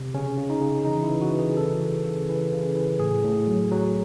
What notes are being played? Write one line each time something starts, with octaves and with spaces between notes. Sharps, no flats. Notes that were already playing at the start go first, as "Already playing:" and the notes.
Already playing: C3
C#3 C#4
C#3
D#4
C#3
E3 D#4
E4
E3
F#4
E3
G#4
C#3 A4
E3
C#3
E3
C#3
E3
A2 G#4
A2
F#3
F#3